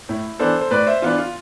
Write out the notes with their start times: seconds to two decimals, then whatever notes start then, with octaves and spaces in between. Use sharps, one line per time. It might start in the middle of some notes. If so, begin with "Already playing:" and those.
0.09 A2 E4
0.39 E3 B3 D4 A4 C5
0.61 C5
0.71 A2 B4 D5
0.86 C5 E5
1.02 E3 B3 D4 F4
1.18 F4